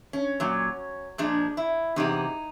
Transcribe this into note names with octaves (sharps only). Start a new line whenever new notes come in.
C#4
A#2 F#3
A#2 F3 G#3 D4
E4
E2 C3 G#3 D#4